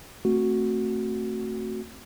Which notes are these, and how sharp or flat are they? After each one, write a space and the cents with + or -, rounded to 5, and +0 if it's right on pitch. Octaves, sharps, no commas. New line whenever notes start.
A3 +20 C4 +10 F#4 +0